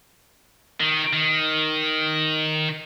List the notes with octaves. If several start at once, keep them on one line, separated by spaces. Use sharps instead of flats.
D#3
D#3